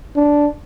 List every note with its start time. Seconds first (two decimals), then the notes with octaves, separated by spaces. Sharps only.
0.16 D4